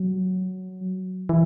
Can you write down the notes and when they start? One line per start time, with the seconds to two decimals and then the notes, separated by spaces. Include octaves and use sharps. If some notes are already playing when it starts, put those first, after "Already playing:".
Already playing: F#3
1.29 E3